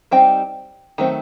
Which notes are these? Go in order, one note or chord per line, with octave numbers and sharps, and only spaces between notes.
G3 C4 D#4 G5
D#3 F#3 A3 C4